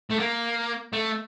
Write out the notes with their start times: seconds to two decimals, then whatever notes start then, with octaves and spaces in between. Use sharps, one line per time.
0.10 A3
0.19 A#3
0.93 A3